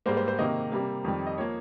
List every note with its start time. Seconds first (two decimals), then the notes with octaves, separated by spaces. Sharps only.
0.06 G#2 G3 A#3 C5
0.17 C5
0.28 C5
0.39 C3 D#3 A#3 D#5
0.72 C3 G3 A#3
1.04 F2 D#3 G3
1.26 D#5
1.38 F3 A#3 C#5